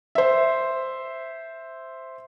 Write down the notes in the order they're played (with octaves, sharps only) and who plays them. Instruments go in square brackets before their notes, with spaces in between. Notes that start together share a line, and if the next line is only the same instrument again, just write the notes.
[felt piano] C5 E5